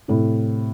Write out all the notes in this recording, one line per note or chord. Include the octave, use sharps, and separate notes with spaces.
A2 C3